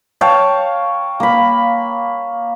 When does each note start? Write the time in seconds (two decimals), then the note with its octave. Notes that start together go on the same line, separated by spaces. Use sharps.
0.21 C#5 F5 G5 A5
1.20 A#3 B5